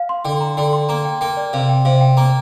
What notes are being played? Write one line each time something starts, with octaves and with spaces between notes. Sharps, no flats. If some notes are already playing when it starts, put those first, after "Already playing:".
Already playing: F5
C6
D3 G5
A#5
D3 G5
C6
A#3 A#5
G5
A#3 G5
D5
D5
C3 F5
G5
C3 F5
G5
A#3 A#5